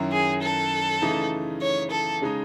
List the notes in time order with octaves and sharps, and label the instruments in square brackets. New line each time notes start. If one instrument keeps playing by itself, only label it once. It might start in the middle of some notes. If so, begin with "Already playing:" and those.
Already playing: [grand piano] F#2 D#3 F#3 C#4 E4
[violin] G#4
A4
[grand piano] C#3 E3 A3 D#4
[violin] C#5
A4
[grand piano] C#3 G#3 D#4